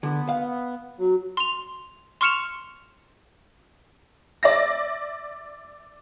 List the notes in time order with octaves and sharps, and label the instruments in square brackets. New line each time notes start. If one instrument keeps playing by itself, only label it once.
[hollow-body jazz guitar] D3 [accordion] B3
[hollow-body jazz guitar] F5
[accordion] F#3 [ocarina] F#4
[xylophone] C6 F7
C6 C#6 F6 C#7 E7 F7
[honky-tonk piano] D5 E5 A#6